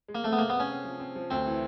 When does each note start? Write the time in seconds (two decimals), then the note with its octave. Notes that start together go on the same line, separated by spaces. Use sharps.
0.08 G#3
0.15 A#3
0.24 A3 C4
0.32 B3
0.39 C3 A#3
0.50 C3 B3
0.60 C#4
0.70 C4
0.85 F3
1.00 C4
1.16 F3
1.31 D2 C4
1.46 E3